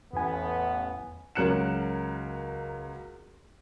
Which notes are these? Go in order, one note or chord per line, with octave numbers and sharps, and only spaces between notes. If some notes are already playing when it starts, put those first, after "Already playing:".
A1 E2 B3 G#5
C#2 F#3 A#4 F#6 C#7 E7